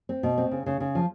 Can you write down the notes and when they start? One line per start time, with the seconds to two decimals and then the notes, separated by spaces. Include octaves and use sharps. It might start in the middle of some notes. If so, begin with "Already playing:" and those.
0.09 C4
0.23 B2
0.38 C4
0.51 C#3
0.66 C#3
0.80 C#3
0.95 F3